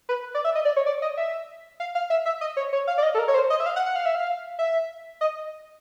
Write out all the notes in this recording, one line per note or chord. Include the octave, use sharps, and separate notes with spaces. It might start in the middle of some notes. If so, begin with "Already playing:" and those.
B4
D5
E5
D#5
D5
C#5
D5
D#5
E5
F5
F5
E5
E5
D#5
C#5
C#5
F5
D5
D#5
A4
A#4
C#5
C5
D#5
E5
F5
F#5
F#5
F5
E5
F5
E5
D#5